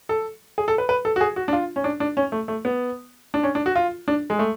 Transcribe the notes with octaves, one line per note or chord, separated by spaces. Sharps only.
A4
G#4
A4
B4
B4
A4
F#4
G#4
F#4
D4
F4
C#4
D4
D4
C#4
A3
A3
B3
D4
C#4
D4
F#4
F4
D4
G#3
A3